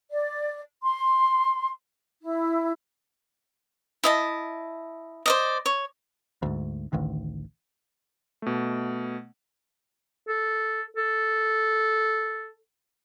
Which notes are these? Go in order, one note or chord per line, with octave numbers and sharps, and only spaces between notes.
D5
C6
E4
E4 D#5 A5
C5 D5 D#5
C#5
D2 G#2
A1 D2 D#3
B2 A3
A4
A4